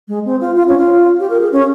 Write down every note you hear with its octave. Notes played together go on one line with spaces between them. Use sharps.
G#3
C4
F4
F4
C#4
F4
G4
A#4
G#4
C#4